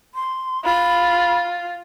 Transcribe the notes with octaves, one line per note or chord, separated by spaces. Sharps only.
C6
F4 B5